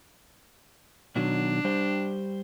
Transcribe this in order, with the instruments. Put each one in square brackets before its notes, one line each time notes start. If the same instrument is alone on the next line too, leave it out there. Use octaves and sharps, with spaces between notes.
[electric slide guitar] B2 D#3 F#3 [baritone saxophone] D4
[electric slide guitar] G3 G4 C5